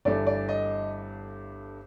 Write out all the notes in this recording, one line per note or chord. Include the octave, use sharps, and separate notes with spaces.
G1 G2 E3 A3 D5
D5
D#5